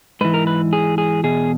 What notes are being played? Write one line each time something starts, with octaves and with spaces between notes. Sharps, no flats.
G#2 E3 B4
A#4
B4
G#4
G#4
E2 B2 G#4